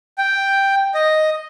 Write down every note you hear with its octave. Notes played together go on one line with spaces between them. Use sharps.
G5
D#5